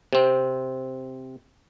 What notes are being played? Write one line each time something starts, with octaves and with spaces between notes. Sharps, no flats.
C3 C4